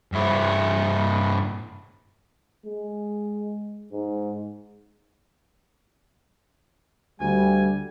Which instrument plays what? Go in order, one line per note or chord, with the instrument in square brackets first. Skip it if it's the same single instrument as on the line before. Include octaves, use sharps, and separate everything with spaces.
[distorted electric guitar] G2 E4
[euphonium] G#3
G#2
[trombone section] D2 G3 [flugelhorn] G#5